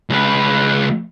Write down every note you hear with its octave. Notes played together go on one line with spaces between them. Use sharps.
C#2 B4